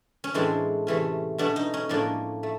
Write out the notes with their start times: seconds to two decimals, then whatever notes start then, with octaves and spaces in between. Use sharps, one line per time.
0.24 C#4
0.34 A2 E3 G#3 C4 D4
0.87 C3 E3 A3 C#4
1.38 B2 F#3 A3 C#4 D4
1.56 D#4
1.74 C#4
1.89 A2 F3 A#3 C#4 D4
2.43 A3